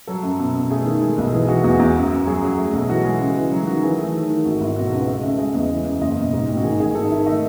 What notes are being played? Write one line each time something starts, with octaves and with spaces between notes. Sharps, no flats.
F#3 A4
F#2
B2
B2
A3 G#4
D#3
G#3
B1
E3 G#4
E3 F#4
E2 F#4
E2
F#2
F#2
F#3 G#4
F#3
A3
B1
E3 F#4
G#3
C#3
E3
F#3
D#3 F#4
E3 G#4
A3
D#3
D#3
G#1 F#4
G#1 E4
B2 F#4
A4
C#2
B4
A3 D#5
C#3 E5
G#3 D#5
E2
E3
F#2
F#1 D#5
B2
G#2
A1
F#4
D#3 G#4
G#1 G#4
D#3 A4
D#3 E5
A3 D#5